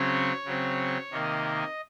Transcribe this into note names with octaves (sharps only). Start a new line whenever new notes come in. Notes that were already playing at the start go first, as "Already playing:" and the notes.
Already playing: C#3 F#3 C4 C#5
C#3 F#3 C4
C3 D#3 A#3 D#5